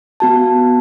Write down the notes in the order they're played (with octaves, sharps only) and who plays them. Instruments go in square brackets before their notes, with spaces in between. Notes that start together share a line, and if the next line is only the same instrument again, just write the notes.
[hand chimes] B3 F#4 A5